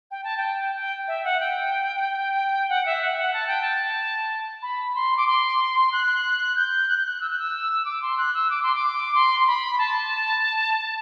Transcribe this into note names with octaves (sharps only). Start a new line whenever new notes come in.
G5
A5
G5
G5
E5
F#5
G5
F#5
E5
F#5
F#5
A5
G5
A5
B5
C6
D6
C6
F#6
G6
F#6
G6
F#6
E6
F#6
E6
D6
C6
F#6
E6
D6
C6
D6
C6
C6
B5
A5